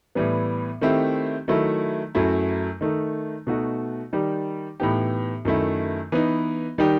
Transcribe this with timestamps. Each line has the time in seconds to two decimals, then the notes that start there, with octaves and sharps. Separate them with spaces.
0.15 A2 E3 G3 B3
0.81 D#3 A3 C4 E4 G4
1.48 D#3 F#3 A3 E4
2.15 F#2 F#3 A3 E4
2.81 D#3 A3 D#4
3.47 B2 A3 D#4 F#4
4.13 D#3 G3 D#4 G4
4.80 A2 E3 B3 D#4 G4
5.45 F#2 D#3 A3 E4
6.12 E3 B3 D#4
6.78 D#3 G3 D#4 G4